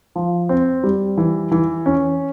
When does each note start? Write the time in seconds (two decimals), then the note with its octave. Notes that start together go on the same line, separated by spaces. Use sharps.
0.16 F3
0.49 C4
0.83 G3
1.18 E3
1.52 E3
1.86 C#4